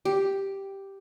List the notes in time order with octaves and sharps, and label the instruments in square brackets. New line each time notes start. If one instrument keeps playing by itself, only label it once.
[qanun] G4